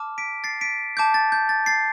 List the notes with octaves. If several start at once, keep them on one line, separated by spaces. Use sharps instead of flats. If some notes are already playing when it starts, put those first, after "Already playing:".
Already playing: A5 D6 F6
B6 D7
A6 C7
B6 D7
A5 D6 G6
A6
G6
A6
A6 C7